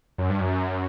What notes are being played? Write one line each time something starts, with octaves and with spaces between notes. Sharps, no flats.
F#2
G2
F#2